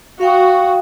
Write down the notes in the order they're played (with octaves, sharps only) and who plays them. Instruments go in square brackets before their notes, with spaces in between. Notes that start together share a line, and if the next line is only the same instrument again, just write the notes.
[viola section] F#4 [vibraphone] F5 G5 D#6